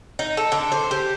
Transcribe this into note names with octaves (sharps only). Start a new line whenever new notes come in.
D#4
A4
D3
C5
G4